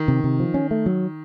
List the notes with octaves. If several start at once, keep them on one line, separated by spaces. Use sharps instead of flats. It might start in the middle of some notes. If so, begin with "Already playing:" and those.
Already playing: D#3
C3
C3
F3
C#4
A3
F#3